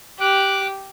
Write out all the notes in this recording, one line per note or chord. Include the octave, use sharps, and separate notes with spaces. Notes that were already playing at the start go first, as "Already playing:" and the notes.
G4 D6 F#6